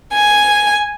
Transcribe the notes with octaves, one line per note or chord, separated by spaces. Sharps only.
G#5